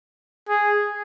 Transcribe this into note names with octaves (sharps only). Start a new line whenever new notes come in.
G#4